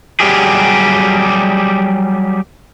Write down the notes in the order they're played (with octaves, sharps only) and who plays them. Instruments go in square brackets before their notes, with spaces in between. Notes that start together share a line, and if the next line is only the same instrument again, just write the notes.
[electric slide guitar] F#3 G3 G4 G#4